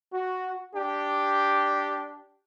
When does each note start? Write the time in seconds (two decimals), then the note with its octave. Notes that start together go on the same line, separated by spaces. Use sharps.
0.13 F#4
0.75 D4 G4